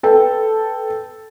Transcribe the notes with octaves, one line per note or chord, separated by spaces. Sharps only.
A4 B4 G5